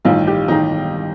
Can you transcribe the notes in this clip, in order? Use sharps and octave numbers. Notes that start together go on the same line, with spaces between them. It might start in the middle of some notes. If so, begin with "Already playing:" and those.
A1 G2 D#3 F4
G4
A1 D#3 D#4